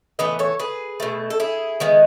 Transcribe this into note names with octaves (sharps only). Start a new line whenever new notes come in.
A2 E3 B3 B4 D#5
A4 C#5
G#4 B4
B2 A3
A4
E4 G#4
D#3 G#3 B3